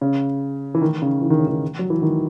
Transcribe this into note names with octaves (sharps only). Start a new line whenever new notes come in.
C#3
E3
D#3
C#3
E3
D#3
C#3
D#3
F#3
E3
D#3